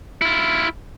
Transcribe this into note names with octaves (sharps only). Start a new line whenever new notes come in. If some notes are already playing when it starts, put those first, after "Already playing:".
E4 F4